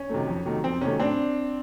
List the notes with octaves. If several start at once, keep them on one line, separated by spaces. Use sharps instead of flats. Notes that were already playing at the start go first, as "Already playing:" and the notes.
Already playing: C#4
C3 D#3 F#3 A3
F2
C3 D#3 F#3 A3
F2 C4
C3 D#3 F#3 A3 C#4
A2 C4 D4